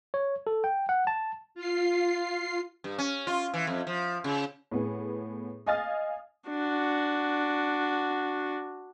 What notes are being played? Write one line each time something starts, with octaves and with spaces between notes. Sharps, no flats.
C#5
A4
G5
F#5
A5
F4 C7
G2
C#4
F4
E3
F2
F3
C#3
A2 B3 G#4
D#5 F5 G#5 D#6 F6 A6
D4 F#4